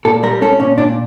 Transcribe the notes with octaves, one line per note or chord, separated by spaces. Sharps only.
A#2 A4
G3 A#4
C#4 A4
A#2 C#4
A#2 D4